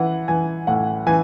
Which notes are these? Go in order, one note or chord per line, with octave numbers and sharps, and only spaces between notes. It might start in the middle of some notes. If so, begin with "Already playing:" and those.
Already playing: E3 F#5
E3 G#5
A2 F#5
E3 G#5